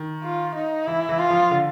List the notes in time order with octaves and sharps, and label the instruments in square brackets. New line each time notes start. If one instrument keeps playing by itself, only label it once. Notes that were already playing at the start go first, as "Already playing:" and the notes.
Already playing: [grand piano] D#3
[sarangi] F4
D#4
[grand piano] E3 [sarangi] E4
[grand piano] E3
[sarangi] F4
[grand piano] F3
D3